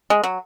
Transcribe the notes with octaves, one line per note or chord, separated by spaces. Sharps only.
G#3
F#3